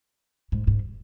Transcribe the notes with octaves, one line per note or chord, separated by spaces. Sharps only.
G#2
G#2